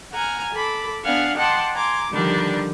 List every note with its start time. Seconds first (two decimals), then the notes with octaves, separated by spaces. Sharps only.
0.13 F#5 G#5 A#5 F6
0.54 A4 B5 D6
1.04 B3 D4 F5 F#5 G#5
1.36 D#5 F#5 G5 A5 C6 D6
1.74 G#5 A#5 C6 D6
2.11 D3 D#3 F3 G3 D4